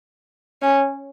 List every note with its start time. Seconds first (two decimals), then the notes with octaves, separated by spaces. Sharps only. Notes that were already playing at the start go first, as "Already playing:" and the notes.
0.62 C#4